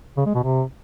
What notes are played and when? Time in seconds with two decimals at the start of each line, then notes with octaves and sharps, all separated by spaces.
0.17 C#3
0.26 G#3
0.34 B2
0.43 C3